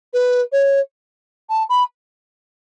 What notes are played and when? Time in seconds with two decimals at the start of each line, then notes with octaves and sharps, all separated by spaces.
0.13 B4
0.52 C#5
1.49 A5
1.69 B5